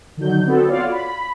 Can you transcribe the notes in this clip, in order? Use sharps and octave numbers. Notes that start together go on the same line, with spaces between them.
D3 D#3 F#3 G6
B3 C4 D4 F#4 A4
F4 F#4 C#5 D5 F5
B5